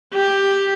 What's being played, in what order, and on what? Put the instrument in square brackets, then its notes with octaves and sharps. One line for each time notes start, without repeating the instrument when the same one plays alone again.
[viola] G4